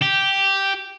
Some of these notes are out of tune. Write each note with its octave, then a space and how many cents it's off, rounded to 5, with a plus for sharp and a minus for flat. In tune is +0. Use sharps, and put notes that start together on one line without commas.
G4 -5